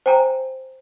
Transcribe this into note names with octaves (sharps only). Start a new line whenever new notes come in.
C5 G5 G#5 A#5